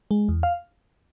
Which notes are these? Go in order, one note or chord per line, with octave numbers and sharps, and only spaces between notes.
G#3
E2
F5